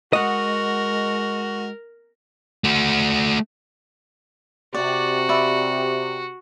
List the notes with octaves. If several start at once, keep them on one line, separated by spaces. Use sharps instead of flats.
G#3 F#4 A#4 D#5 F#5
A3 F#4
C3 F#4 G4 D5
D5 E5 B5